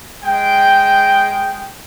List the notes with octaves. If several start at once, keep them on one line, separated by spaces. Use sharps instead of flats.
G#3 G5